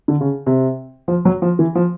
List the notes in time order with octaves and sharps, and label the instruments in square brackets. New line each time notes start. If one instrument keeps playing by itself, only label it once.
[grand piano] D3
C#3
C3
F3
F#3
F3
E3
F3